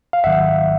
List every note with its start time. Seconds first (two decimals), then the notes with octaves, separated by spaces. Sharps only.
0.13 F5
0.24 G#1 G#2 D#3 F#3 E5 F#5